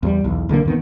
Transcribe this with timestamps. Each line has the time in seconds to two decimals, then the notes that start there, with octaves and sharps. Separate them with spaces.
0.03 E2 F#3 G3
0.24 B1 E2
0.49 B1 D3 F#3 A#3
0.65 F2 D#3 B3